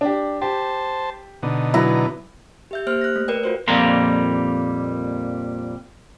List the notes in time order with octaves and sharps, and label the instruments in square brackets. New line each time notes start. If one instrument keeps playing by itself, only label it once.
[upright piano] D4 G4
[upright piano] G4 [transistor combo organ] C5 A5
[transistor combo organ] B2 D3 D#4
[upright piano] F#3 B3 [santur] E4 A#5
[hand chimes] G4 E5 G6
A#3 G4 C5 F6
F#6 A#6
A3
A#4 B4 D5 G5
F4 F#4 C5
[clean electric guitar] F2 A#2 G3 A#3 A#5 C6